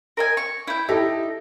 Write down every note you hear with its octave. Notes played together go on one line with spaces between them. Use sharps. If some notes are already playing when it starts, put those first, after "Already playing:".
A#4 D#5 G#5
C#6
E4 G5
D#4 E4 G4 A4